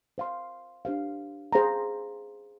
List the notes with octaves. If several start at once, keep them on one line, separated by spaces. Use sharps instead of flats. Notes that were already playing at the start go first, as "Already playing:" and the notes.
C5 F5 C6
D4 G4 C5 F5
G#4 C5 F5 A#5